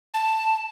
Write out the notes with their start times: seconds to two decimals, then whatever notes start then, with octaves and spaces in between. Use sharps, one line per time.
0.14 A5